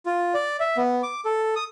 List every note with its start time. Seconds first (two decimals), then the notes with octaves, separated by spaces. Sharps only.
0.06 F4
0.34 D5
0.60 E5
0.77 B3
1.03 D6
1.25 A4
1.56 D#6